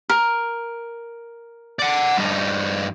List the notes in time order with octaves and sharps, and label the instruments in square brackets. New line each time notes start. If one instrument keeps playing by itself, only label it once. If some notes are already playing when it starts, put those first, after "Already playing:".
[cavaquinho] A#4
[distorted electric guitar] D5 F#5
G2 D#4